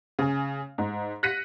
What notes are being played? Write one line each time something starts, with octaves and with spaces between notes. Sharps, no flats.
C#3 G#5
G#2
F#6 A#6 B6 C#7 D#7